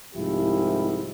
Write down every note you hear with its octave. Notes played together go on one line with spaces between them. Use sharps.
C2 G#2 F3 G#3 E4 G4